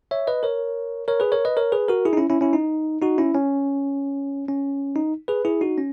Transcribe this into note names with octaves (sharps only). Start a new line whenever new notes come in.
C#5 E5
B4 D#5
A#4 C#5
A#4 C#5
G#4 B4
A#4 C#5
B4 D#5
A#4 C#5
G#4 B4
F#4 A#4
E4 G#4
D#4
C#4 E4
C#4 E4
C#4 E4
D#4
D#4 F#4
C#4 E4
C#4
C#4
D#4
G#4 B4
E4 G#4
D#4 F#4
C#4